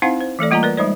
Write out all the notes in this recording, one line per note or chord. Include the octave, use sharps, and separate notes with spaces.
C4 D#4 E4 C5 F5 F#5
C5
E3 A3 A4 D5
G3 A#3 F4 D#5 G#5 A#5
A#4 B4 D5
G3 G#3 D#4 C5 D5